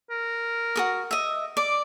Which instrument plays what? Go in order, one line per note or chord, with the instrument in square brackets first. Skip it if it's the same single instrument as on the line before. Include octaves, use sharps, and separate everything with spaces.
[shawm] A#4
[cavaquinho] F#4 A4 D#6
D#5 E5
[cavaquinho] D5 [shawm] D6